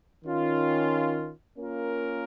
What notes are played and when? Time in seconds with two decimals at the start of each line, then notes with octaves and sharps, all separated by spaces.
0.24 D#3 C#4 F4
1.58 A#3 C#4 F4 A#4